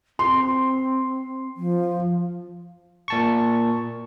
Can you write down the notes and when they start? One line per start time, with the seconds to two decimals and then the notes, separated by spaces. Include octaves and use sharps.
0.19 C4 C6
1.57 F3
3.08 A#2 A5 C#6